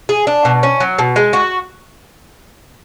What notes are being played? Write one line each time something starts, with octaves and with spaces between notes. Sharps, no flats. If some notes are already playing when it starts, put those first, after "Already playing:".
G#4
D4
B2
C#4
F#3
B2
G#3
F#4